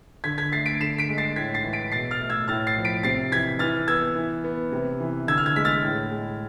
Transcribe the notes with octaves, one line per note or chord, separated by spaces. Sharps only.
D3 G#6 B6
G#6 B6
A3 A6 C7
B6 D7
D3 C7 E7
B6 D7
G#3
A6 C7
A2 G#6 B6
A6 C7
E3
B6 D7
B2 A6 C7
F6 A6
A3
E6 G#6
A2 F6 A6
A6 C7
F3
B6 D7
C3 A6 C7
E3 G#6 B6
E3 F6 A6
B3 E6 G#6
E3
B3
C3
E3
D3 E6 G#6
F6
E6 G#6
G#3 B6
F6 A6
A2
G#3